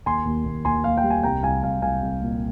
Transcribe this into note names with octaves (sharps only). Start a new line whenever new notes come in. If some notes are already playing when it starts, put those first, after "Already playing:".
D#2 G#5 C6
D#2
D#2
D#2 G#5 C6
D#2 F5
G5
G3
G#5
C2 G5 A#5
C2 F5 G#5
C2 F5 G#5
C2 F5 G#5
C2
A#2